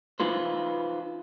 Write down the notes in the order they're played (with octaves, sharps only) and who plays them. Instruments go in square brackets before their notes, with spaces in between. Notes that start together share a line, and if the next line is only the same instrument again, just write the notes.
[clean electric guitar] D#4 F4 B4 C5